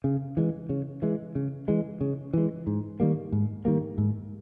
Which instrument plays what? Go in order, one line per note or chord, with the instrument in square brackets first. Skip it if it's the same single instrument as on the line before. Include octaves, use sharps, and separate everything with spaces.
[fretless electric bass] C#3
E3 G#3
C#3
E3 G#3
C#3
E3 G#3
C#3
E3 G#3
G#2
D#3 G3 A#3
G#2
D#3 G3 A#3
G#2